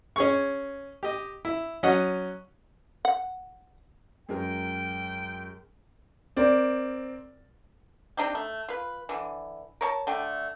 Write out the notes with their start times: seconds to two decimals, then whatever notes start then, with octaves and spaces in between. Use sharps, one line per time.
0.16 C#4 G#4 C#6
1.03 G4 D#5
1.45 E4
1.83 F#3 C#4 D#5 F#5
3.05 F#5
4.29 F#2 G#3 A#4 G5
6.37 C4 A#4 D5
8.17 C4 D4 D#4 G4
8.35 A3
8.68 F4 B4
9.09 D3 E3
9.81 A#4 C#5 A5
10.07 D3 A3 G5